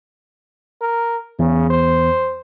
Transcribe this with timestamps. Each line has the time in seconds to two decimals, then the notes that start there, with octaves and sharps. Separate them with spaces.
0.81 A#4
1.39 E2 C#3
1.70 C5